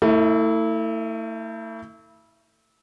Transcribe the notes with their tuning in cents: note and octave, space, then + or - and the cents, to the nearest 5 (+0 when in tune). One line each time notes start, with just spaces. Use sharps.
A3 +35 E4 -25